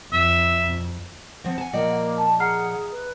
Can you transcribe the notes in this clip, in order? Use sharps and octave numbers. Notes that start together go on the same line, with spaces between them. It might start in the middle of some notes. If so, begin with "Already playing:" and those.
F2 E5
F3 C4 F#5
G#5 A5
A#2 F3 A#3 D5 D#5 G5
A5
G#4 F#5 A#5 F6 C7
B4